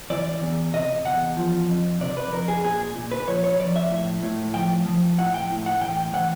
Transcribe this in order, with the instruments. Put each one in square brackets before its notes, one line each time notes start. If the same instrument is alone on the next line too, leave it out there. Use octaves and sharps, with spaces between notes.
[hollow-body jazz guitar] E3 D5
E2
C3 D#5
E2 F#5
F3
F2
C3 D5
B4
F2 A#4
G#4
A#2 G#4
A#2
B4
F3 C#5
C#5
F3 D5
E5
A2
A2
F3 G5
F3
A2 F#5
G5
A2
F#5
E3 G5
G5
E3 F#5